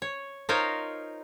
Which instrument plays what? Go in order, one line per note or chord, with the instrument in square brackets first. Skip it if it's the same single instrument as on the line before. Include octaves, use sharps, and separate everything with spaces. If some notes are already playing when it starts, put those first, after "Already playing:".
[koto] C#5
D#4 F4 A#4 C5 C#5 F5